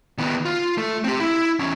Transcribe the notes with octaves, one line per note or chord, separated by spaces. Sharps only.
D#3 B3
F4
A3
C4 G4
E4
E2 C#4